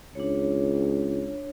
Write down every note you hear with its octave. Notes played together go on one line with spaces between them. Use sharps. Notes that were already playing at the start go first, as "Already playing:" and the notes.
C#2 D4 C#5